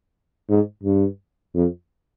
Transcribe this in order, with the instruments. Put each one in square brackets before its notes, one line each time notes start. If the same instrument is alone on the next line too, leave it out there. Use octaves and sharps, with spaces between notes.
[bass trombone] G#2
G2
F2